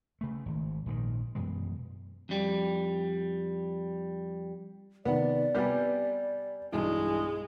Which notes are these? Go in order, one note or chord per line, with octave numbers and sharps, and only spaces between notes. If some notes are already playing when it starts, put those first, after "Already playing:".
C#3 A3
G#1 G#2
A#1 G#2 D3 D#3
F#2 B2 E3 G#3
F2 G3
C3 D#3 B3 D5 F#5
C3 G3 B3 G#5 G6
B1 G2 E3 G#3